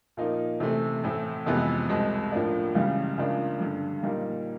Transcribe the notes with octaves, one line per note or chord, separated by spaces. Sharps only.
A#2 F3 A#3 D#4
C3 E3 A3 C4
A2 E3 A3 C4 E4
F2 C3 E3 G#3 B3
C2 B2 G#3 C4
A2 F3 A#3 D4
C#2 C#3 E3 G3
C#2 C#3 F3 A#3 D4
G2 D3 G3
A#2 G3 A#3 D#4